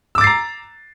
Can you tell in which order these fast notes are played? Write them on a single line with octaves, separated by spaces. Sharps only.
E6 D6 A6 C7 A#5